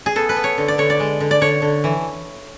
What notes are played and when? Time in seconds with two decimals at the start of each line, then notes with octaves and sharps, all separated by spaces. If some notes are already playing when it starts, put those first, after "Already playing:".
0.06 G#4
0.16 B3 A4
0.29 B4
0.36 B3
0.44 C#5
0.58 D3
0.68 D5
0.78 D3 C#5
0.90 D5
1.00 G#3
1.20 D3
1.31 D5
1.41 D3 C#5
1.62 D3
1.84 E3